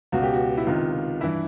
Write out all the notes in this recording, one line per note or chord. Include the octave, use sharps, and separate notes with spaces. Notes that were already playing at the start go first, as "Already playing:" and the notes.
C#2 B2 F#4
G4
F#4
E4
C#2 C3 D#3 F4
G2 E3 E4